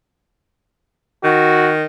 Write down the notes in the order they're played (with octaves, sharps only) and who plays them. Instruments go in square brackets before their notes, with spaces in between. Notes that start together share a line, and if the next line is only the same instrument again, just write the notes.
[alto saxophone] D#3 [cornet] F#4